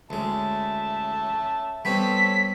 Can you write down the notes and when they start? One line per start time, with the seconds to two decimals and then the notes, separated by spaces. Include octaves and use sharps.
0.10 D2 G#3 C#4 E5 A5
1.85 G3 B3 C4 A4 C#5 B6